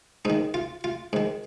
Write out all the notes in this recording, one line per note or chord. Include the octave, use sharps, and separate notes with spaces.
G#2 D#3 D#4
F4
F4
G#2 D#3